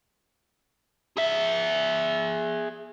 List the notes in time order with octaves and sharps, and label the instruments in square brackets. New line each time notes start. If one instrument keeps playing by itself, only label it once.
[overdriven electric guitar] G#4 E5